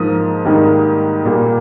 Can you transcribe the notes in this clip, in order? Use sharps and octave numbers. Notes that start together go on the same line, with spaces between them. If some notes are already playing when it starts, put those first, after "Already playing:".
Already playing: G#2 F3 A#3 D#6
G#2 D#3 G3 A#3
A#2 G3 A#3